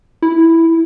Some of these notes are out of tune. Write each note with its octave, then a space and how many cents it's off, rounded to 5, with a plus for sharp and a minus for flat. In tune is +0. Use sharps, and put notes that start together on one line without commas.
E4 +0